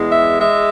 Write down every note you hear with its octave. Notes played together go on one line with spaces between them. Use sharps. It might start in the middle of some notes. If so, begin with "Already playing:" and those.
Already playing: E2 G#3
E5
G#3 E5